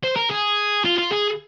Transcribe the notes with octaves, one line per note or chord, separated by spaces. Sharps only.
C5
A#4
G#4
F4
F4
G#4